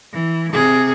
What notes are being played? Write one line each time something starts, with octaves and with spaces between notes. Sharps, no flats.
E3
C3 G#4